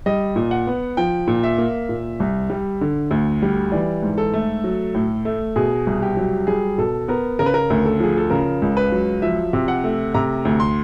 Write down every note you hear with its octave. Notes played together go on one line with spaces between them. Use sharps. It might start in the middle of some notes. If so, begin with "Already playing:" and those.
G3 D#5
A#2
F#5
B3
F3 G5
A#2
E5
A#3
A#2
C2
G3
D3
D2
G3
E3 D5
G#2
A4
A3
F#3
A2
A3
B2 G#4
C2
G4
F#3
G3 G#4
B2 A4
B3 A#4
C#3 A#4
B4
A#4
D2
A4
F3 G#4
A4
C#3 A#4
C#2
B4
F#3
F3 E5
C3
F#5
A3
C3 A#5
D2
C6